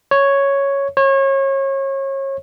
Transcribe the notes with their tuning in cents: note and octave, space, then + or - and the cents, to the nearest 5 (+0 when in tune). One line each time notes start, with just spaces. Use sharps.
C#5 +0
C#5 -30